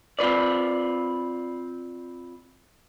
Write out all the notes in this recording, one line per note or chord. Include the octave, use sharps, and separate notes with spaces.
C4 F4 B4 D5